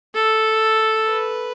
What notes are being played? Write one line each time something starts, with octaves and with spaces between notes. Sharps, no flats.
A4
B4